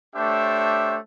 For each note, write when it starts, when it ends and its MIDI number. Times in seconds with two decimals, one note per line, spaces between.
0.16 0.97 57
0.16 0.97 62
0.16 0.97 67
0.16 0.97 72
0.16 0.97 73
0.16 0.97 76